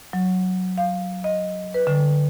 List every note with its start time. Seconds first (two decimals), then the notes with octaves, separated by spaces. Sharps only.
0.13 F#3
0.78 F5
1.24 D#5
1.74 B4
1.87 D3